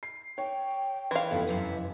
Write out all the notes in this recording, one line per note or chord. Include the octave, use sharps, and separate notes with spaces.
C7
C#5 G5
E3 F5 C6
F1 F3 B3 C#4 A4
F#2 C3 E4